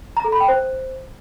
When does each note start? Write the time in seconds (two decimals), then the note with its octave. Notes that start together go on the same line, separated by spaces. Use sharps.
0.17 A#5
0.24 A4
0.32 B5
0.40 G5
0.48 C5